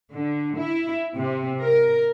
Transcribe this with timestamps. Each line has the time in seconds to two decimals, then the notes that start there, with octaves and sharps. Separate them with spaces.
0.13 D3
0.58 E4
1.15 C3
1.61 A#4